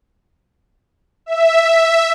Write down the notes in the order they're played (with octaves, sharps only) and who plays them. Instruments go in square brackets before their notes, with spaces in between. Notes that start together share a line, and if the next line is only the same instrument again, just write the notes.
[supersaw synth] E5